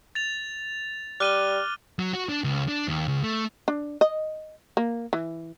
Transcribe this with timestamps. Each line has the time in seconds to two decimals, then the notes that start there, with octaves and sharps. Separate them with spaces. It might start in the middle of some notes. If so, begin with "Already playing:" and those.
0.15 A6 F7
1.20 G3 D6 F6 F#6 D#7 G7
1.99 F#3
2.13 F#4
2.29 D4
2.44 C#2
2.69 D4
2.88 D#2
3.08 C#2
3.24 A3
3.68 D4
4.01 D#5
4.77 A#3
5.13 E3